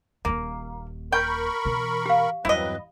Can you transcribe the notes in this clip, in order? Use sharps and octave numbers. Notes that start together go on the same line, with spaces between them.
D#1 D#2 A#3
A#4 G5 B5 C#6
B2 E3
G4 F5
E2 G2 F#3 C4 E4 B4 D#5